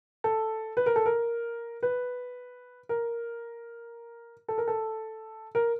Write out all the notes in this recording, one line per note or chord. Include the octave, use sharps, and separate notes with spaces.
A4
B4
A#4
A4
A#4
B4
A#4
A4
A#4
A4
A#4